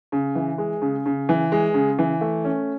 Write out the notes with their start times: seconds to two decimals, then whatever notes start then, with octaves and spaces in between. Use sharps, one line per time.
0.12 C#3
0.35 E3
0.58 G#3
0.82 C#3
1.06 C#3
1.29 E3
1.52 G#3
1.74 C#3
1.99 E3
2.21 A3
2.45 C#4